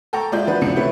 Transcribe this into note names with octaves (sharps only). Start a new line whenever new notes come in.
A4 G5 A#5 C#6
G#3 F4 D5 E5 G6
E3 F3 D4 F#4 B4
G#1 C#2 C3 D4 C#7
E3 A3 E4 G4 B4 C#5